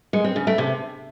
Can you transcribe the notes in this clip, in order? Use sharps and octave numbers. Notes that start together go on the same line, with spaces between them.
G#3
C4
C#3
A3
C3